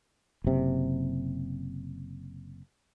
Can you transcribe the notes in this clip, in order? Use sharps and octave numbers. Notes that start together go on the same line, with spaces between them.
F#1 C3